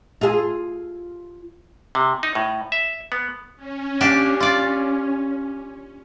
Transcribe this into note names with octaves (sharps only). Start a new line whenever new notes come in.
F4 G#4
C3
D#4
A2
E5
B3
C#4
A#3 D4 G4
F4 D5